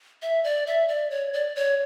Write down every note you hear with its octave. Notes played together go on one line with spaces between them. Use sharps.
E5
D5
E5
D5
C#5
D5
C#5